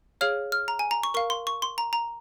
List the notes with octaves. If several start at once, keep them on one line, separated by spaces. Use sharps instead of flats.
G#4 C#5 F5 F6
F6
A#5
G#5
A#5
C#6
A#4 F5 C#6
C6
C#6
C6
A#5
A#5